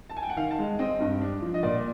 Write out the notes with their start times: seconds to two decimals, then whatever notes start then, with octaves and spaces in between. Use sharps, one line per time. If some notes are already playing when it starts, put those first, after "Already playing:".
0.10 A5
0.17 G#5
0.23 G5
0.30 F#5
0.37 D#3 F5
0.51 A5
0.59 G#3
0.79 C4 D#5
1.00 G2
1.21 D4
1.42 F3
1.54 D#5
1.63 A#2 D5